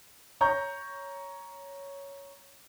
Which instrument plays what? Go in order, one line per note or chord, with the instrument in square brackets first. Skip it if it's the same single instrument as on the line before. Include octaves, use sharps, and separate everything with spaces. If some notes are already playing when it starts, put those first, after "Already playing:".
[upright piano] C#5 A#5 C#6 G6